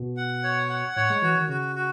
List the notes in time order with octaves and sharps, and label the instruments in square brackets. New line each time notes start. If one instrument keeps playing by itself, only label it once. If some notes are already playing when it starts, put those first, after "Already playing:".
Already playing: [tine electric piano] B2
[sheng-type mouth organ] F#5
C#5
F#5
[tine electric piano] A2 [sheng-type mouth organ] C#5
[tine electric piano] G#3
[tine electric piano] E3 [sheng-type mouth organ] F#4
[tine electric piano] D#3
[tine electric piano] C#3 [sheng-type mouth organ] F#4
[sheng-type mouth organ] F#4